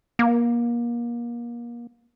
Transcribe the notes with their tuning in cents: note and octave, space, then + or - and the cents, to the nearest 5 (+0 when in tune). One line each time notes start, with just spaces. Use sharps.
A#3 +30